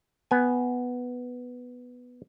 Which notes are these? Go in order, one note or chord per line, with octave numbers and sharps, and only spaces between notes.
B3 G#5